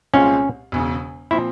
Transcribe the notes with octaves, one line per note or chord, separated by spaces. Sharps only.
C2 A#2 G#3 C4 C#4 F4
E1 E2 C#3
A#2 F3 C4 E4